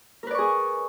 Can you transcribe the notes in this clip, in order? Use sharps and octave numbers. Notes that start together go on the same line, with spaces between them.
G#4 A#4 B4 D5 C#6